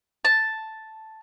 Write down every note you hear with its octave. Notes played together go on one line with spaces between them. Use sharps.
A5